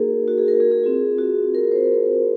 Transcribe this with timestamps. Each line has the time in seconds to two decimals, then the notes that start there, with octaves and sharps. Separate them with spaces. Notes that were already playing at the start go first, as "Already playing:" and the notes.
Already playing: A#3 D#4 F#4 G#4 A#4
0.28 F#4
0.38 G#4
0.48 A#4
0.60 G#4
0.71 G#4
0.83 C4 F4
1.18 F#4
1.55 A#4
1.72 C5